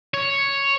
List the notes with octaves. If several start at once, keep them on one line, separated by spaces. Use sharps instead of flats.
C#5